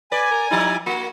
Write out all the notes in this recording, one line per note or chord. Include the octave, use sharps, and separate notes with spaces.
B4 D5 G#5
A#4
F3 G3 D#4 E4
A#3 F#4